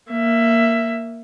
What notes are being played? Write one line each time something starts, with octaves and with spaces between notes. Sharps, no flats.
A#3 E5